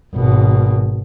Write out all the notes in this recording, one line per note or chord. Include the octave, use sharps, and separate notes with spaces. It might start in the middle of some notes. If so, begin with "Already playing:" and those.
G#1 B2